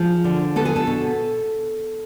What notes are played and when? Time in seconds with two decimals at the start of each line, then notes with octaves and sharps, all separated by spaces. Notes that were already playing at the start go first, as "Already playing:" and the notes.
Already playing: F3 G#4
0.24 D3
0.56 B3 A4
0.65 G#4
0.76 A4
0.87 B2